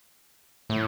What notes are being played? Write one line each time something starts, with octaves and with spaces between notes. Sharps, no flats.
A2